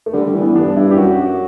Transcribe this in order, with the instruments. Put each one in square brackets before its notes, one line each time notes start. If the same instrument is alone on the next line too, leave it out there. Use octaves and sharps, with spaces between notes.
[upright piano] A3
[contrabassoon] D3 [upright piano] G3
[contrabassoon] D3 [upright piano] G3
[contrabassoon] E3
[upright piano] B3
[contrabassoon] G2 [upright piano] D4
[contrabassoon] G2 [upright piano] E4
[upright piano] G4
[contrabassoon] F#2 [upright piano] F#4